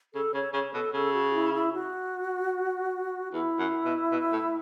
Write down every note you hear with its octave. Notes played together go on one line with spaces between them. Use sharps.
C#3 A4
C#3 C#5
C#3 C#5
B2 A4
C#3 A4
F#4
E4
E4
F#4
E2 E4
F#2
B2
B2
A2